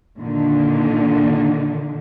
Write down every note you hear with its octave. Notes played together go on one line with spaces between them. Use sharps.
A#2 D3 D#3